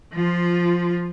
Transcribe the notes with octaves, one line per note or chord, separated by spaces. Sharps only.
F3 F4